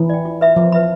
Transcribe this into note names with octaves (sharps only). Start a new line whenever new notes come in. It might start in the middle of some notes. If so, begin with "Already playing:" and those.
Already playing: E3
D5 G5
F4
B4 E5 B5
F3 F4
B4 E5 B5